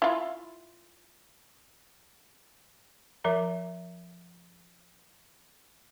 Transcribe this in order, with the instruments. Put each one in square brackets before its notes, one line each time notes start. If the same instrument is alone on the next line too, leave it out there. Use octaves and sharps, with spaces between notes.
[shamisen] E4 F4
[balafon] F3 A#4 E5 A#5